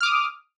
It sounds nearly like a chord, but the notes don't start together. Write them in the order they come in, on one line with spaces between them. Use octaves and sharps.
F6 D6 D#6